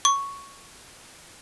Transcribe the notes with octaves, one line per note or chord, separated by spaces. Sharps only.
C#6